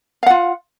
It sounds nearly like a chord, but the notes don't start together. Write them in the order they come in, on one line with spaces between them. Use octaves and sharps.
F5 F#5 F4